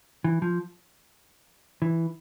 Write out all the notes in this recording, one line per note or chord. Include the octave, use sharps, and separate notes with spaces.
E3
F3
E3